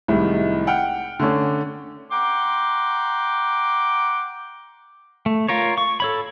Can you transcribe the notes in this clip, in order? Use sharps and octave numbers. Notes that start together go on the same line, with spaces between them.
C2 A2 C3 D#3 G#3
F#5 G5 F6
D3 A3 C#4 D4
F#5 G5 A#5 C6 D6
A3
F4 A#4 C#5
C#6
A4 C#5 B5